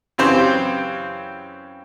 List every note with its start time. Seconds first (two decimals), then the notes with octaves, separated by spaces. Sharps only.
0.18 F#2 C#3 E3 C4 G4 C5